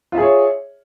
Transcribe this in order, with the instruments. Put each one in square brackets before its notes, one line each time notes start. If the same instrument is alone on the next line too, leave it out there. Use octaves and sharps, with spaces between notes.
[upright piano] F4
E5
G#4
C#5